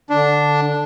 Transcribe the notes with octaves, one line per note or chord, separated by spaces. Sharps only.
D3 D4